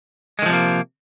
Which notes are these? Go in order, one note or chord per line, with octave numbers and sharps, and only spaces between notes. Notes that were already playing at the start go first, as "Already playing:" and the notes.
C3 D#3 F3 G#3 A#3